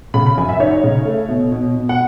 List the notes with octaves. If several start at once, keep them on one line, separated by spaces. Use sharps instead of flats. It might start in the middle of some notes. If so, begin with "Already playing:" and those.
C#3 B5
B5
F#2 G#5
E5
D#4 C#5
C#3
A3
B2
B2
B2
F#5